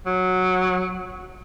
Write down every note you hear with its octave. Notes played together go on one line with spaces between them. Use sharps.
F#3